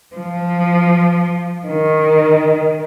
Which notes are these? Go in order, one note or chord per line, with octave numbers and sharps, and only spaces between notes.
F3
D#3